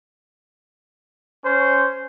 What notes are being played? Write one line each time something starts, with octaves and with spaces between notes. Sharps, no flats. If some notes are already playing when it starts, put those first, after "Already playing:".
C#4 C5